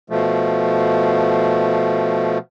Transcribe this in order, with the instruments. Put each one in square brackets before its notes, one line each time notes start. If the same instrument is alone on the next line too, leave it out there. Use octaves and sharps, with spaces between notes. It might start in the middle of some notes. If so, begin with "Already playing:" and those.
[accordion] B2 F3 A3